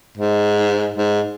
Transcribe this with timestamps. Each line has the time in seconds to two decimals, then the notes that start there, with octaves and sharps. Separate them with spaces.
0.18 G#2
0.97 G#2